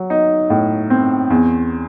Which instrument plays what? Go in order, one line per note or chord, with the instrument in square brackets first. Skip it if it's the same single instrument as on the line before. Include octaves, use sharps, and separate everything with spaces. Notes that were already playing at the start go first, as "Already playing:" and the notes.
Already playing: [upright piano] F#3
D#4
A2
C4
E2